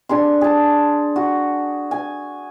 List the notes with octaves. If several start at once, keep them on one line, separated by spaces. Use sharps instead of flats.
D4 G#4 C6
G#4 A5
F#4
G#5